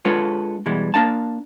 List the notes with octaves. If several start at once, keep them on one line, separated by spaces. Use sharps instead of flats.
G#3 D4 F4 A4 B4 C#5
B2 E3 G3 G#3
A#3 D4 F5 A5